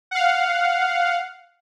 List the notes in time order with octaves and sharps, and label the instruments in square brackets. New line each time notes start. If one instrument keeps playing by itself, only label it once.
[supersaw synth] F5 F#5